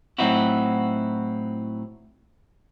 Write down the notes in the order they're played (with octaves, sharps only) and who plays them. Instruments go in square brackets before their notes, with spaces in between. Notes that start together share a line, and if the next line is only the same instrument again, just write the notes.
[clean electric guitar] A2 F#3 C4 D#4 E4 F#4